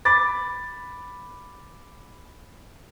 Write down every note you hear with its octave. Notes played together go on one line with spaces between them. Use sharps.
B5 D6 A6